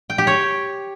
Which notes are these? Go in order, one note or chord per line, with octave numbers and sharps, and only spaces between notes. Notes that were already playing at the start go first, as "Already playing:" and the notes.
G5
G4
C#5